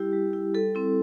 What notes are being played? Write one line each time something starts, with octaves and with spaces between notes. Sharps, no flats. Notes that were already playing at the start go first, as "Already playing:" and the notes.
Already playing: G3 E4 G4
G3
E4
G3 A4
C4 E4